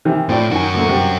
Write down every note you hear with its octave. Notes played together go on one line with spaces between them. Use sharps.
C3 D#3 E3
A2 C4 F4 D5
F#2 D#3 F#4 G#5
D2 A#2 D3
G2 C3